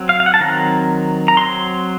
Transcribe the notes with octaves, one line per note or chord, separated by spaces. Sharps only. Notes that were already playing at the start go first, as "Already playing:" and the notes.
Already playing: F#3 C4
F5
F5
F#5
A5
D#3 F#3 C4 A#5
A#5
F#3 C4 C6